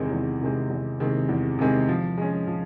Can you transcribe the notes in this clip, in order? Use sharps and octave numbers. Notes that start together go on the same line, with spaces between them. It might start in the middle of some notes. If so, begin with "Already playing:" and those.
Already playing: E2 C3 D#3 G#3 C4
E2
C3 D#3 G#3 C4
E2
C3 D#3 G#3 C4
E2
C3 D#3 G#3 C4
F3
G#3 C#4
F3